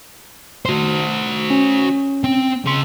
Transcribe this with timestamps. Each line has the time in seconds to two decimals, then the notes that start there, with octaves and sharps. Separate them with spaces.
0.66 F#4 C5
1.50 C#4
2.24 C4
2.65 C#3 C6